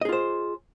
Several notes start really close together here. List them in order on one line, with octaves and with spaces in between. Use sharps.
D#5 G#4 F4 C5